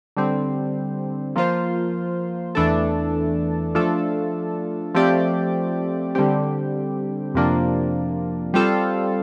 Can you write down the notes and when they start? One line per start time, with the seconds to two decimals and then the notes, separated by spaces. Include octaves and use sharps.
0.17 D3 G3 C4
1.36 F3 A#3 F4 C5
2.55 E2 E3 A3 D4 A4
3.75 F3 A3 D4 F4 A4
4.95 F3 A3 C4 G4 D5
6.15 D3 G3 C4 G4
7.34 F2 C3 F3 A#3 D4
8.54 G3 C4 F4 A4